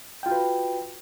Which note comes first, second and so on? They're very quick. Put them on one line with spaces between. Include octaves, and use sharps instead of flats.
G5 F4 F#4 B4